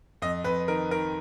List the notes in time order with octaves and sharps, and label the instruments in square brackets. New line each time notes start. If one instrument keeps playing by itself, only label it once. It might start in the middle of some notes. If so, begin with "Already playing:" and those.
[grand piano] F2 D#5
F2 B4
D#3 A#4
D#3 A#4